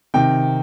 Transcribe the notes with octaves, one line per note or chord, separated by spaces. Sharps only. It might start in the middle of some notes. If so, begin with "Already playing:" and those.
C3 D#3 G5